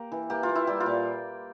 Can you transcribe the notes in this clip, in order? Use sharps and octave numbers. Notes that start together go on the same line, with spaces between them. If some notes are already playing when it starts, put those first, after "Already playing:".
Already playing: A#3 G4
E3
A#3 G4
F4
A#3
E4
G3 G4
F4
A#2